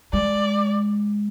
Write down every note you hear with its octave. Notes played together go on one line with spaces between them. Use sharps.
G#3 D5